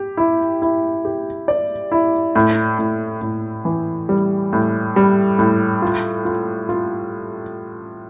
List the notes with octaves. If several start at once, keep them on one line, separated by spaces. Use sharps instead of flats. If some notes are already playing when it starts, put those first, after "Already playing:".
Already playing: G4
E4
E4
G4
D5
E4
A2
A2
A2
E3
G3
A2
G3
A2
F4
F4
F4